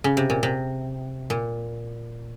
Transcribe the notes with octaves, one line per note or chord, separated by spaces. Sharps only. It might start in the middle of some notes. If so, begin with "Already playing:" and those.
C#3
C3
A#2
C3
A#2